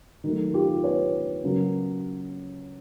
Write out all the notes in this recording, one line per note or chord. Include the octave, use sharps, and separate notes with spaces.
D#3 F#3 A3
F4 G4
B4 C#5
C#3 F#3 A#3